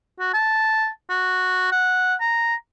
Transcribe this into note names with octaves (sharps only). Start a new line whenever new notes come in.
F#4
A5
F#4
F#5
A#5